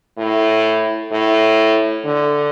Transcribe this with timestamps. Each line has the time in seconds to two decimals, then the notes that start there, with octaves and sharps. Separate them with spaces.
0.17 A2
1.12 A2
2.06 D3